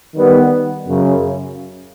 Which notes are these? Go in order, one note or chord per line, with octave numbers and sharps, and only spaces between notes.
D#3 G3 B3
F#2 C#3